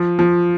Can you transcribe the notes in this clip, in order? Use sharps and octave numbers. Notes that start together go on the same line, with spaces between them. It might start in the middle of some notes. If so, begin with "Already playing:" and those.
Already playing: F3
F3